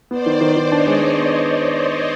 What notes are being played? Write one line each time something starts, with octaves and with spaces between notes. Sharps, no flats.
B3 C5 D5
D#3
D#3
D#3
D4 C#5 D#5
G#3
G#3
B3